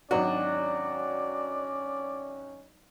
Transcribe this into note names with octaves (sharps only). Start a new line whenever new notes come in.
G#1 F#3 C#4 D4 F#4 D5